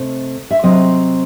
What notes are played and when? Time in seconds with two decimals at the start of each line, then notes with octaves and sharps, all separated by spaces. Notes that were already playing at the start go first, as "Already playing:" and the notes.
Already playing: C3 A3 D#5
0.51 E5
0.63 C3 F#3 C4 D#5